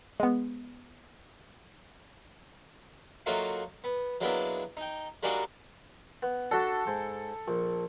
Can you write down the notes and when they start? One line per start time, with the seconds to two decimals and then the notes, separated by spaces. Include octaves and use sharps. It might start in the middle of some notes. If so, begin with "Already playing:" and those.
0.20 G#3 B3
3.26 F#3 A3 A#3 D#4 F4 F#4
3.84 B3
4.21 F#3 G#3 A#3 B3 D4 E4
4.77 D#4 G5
5.23 G3 G#3 A#3 D4 D#4 F#4
6.23 B3
6.51 D4 F#4 A4 A5
6.87 G#2
7.48 A#1